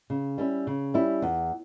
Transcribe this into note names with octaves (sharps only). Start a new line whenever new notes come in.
C#3
G3 C#4 E4
C#3
G3 C#4 E4
E2